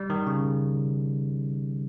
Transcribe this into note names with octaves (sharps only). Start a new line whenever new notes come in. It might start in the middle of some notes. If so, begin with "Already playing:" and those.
Already playing: G3
D#3
C#3